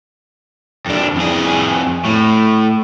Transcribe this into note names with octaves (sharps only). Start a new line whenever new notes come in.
F2 D4
F2 G#4
A2